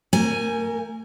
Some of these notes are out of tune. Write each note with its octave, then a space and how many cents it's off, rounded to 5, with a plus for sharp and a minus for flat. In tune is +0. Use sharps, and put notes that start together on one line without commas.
A3 +45 A#4 +0 G#5 +0